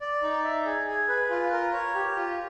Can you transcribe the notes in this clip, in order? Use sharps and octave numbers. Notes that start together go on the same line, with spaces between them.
D5
D#4
E5
G#4
G#4
B4
F4
A#4
C#5
G4
F4